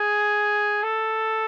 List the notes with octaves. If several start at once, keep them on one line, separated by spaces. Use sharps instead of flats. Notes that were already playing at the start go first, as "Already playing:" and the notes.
Already playing: G#4
A4